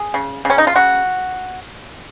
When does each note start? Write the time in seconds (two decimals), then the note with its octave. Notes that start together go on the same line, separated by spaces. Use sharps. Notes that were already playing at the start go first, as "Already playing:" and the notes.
Already playing: G#4
0.14 C#3
0.45 C#3 C#4
0.58 D#4
0.67 F4
0.76 C#3 F#4